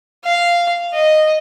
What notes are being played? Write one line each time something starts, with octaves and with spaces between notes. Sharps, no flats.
F5
D#5